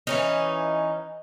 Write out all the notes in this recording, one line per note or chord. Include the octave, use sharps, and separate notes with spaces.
E3 C#4 D#4